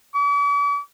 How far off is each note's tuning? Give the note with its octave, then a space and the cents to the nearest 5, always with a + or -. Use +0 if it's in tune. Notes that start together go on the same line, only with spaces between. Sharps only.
D6 -45